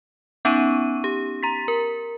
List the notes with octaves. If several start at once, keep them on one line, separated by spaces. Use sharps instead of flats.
B3 C#4 D#4 C#6 D#7
G4
A#5 C6 A6 B6
A#4